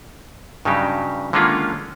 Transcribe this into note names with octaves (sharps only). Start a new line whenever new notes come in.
G2 C#3 F#3 D#4 G4
D3 D#3 G#3 A#3 C#4 F4